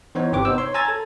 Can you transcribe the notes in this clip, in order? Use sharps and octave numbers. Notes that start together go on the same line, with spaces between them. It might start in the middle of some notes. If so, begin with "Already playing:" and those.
E3 B3 D#4 C5 C#5
G1 C3 G4 B4 D6
B3 D#4 C5 E6
C#5 C6
G#5 A#5 E6 G#6 A6
A4